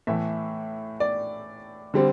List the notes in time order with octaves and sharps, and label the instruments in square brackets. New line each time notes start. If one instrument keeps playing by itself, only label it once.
[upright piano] A2 E3 A3 E5
D5
D3 G3 C4